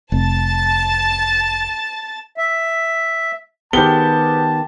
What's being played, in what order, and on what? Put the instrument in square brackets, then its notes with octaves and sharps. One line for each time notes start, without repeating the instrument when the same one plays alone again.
[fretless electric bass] F1 [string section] A5 A6
[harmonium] E5
[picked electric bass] D#3 B3 [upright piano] G4 G7 [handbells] G#4 B4 C5 [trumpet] A5